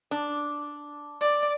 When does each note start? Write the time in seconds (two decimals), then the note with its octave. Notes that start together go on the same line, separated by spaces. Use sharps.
0.11 D4
1.22 D5